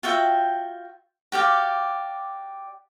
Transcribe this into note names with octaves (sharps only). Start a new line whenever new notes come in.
F4 F#4 E5 G5
F#4 G4 D5 F5